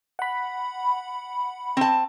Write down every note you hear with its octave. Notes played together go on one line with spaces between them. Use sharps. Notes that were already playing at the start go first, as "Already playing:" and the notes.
F#5 B5
C4 A5